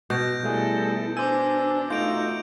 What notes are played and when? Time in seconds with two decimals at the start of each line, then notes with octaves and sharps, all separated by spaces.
0.10 B2 G6 A#6 D7
0.43 G3 A3 E4 G#4 A4
1.17 D4 C5 G#5 D6 E6
1.90 A3 D#4 F4 F#4 G6 D7 F7